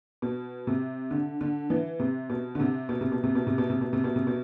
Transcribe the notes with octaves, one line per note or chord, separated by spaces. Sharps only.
B2
C3
D3
D3
E3
C3
B2
D3
C3
B2
C3
B2
C3
B2
C3
B2
C3
B2
C3
B2
C3
B2